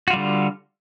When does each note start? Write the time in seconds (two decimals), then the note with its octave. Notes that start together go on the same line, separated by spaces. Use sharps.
0.08 F#4
0.10 F4
0.13 G3
0.16 D3